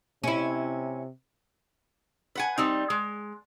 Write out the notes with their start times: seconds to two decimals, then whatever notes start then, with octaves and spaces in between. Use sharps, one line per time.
0.24 C3 C#4 E4
2.35 B4 F#5 G#5
2.58 G3 C4 D#4
2.90 G#3